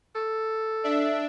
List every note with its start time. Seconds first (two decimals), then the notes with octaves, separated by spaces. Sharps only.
0.15 A4
0.84 D4 E5